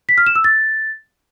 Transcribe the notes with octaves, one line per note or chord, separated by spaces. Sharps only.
B6
F6
E7
E6
A6